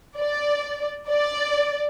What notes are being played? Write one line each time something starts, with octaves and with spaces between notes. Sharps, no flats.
D5
D5